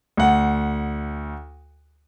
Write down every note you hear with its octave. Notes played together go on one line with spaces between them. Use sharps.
D2 F#5